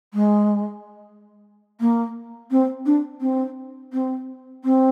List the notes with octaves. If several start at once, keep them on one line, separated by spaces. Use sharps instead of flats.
G#3
A#3
C4
D4
C4
C4
C4